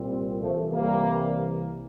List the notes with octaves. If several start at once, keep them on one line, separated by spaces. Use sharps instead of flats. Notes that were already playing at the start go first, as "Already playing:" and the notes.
Already playing: C2 A#2 G3 C4
C2 C3 E3 F3 A3
G3 A#3